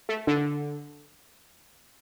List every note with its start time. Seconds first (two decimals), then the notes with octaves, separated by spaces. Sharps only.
0.09 A3
0.27 D3